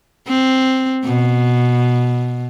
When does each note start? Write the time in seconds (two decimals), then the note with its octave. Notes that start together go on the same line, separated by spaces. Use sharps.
0.27 C4
1.05 B2